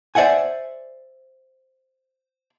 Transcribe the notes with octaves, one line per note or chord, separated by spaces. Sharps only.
C5 D5 E5 F#5 G#5